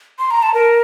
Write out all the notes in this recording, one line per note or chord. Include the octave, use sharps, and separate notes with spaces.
C6
A#5
A5
A#4